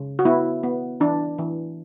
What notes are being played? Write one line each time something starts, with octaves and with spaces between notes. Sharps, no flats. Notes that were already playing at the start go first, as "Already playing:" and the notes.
Already playing: C#3
F#4
B3 E4
B3
E3 D4
E3